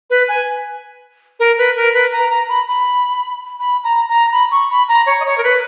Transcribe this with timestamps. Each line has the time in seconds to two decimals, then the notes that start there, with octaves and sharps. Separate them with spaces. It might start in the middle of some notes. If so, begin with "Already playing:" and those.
0.10 B4
0.28 G#5
1.40 A#4
1.58 B4
1.76 A#4
1.94 B4
2.12 A#5
2.30 A#5
2.49 B5
2.68 B5
3.60 B5
3.84 A#5
4.09 A#5
4.32 B5
4.51 C#6
4.70 B5
4.89 A#5
5.06 C#5
5.20 D#5
5.25 C#5
5.38 A#4
5.44 B4